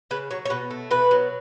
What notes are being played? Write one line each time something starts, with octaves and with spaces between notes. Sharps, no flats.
C#3 B4
F#3 C#5
C#5
B2 B4
A3
B2 B4
F#3